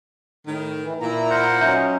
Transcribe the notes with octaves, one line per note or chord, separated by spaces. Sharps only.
A2 D#3
E3
A#2 E4 A#5
A#4 C5 F#5
F#3 C#4 D#4 E5 A#5 G6